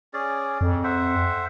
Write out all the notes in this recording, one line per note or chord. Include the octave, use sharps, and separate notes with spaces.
C#4 G#4 D5
F2
C5 E5 F#5